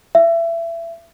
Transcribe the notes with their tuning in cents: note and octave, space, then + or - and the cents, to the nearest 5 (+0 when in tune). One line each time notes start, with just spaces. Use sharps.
E5 +25